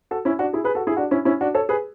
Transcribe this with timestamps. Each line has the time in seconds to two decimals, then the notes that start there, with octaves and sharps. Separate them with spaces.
0.11 F#4 A4
0.25 C#4 E4
0.39 D4 F#4
0.53 E4 G#4
0.64 G#4 B4
0.75 F#4 A4
0.87 E4 G#4
0.97 D4 F#4
1.11 C#4 E4
1.25 C#4 E4
1.41 D4 F#4
1.55 A4 C#5
1.69 G#4 B4